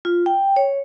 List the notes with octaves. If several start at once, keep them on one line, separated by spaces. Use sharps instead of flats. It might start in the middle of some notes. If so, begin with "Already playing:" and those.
F4
G5
C#5